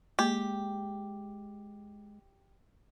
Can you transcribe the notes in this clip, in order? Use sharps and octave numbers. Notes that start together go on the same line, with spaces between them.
G#3 A#3 G4